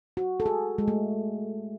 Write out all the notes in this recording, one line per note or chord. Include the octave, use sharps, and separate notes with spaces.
F#4
A4
G#4
G#3
A3